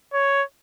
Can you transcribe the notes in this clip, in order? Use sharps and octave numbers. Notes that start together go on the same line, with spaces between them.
C#5